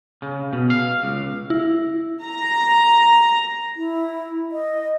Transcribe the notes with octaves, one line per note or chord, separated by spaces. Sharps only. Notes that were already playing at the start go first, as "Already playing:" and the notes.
C#3
B2
F5
C#2
E4
A#5
E4
D#5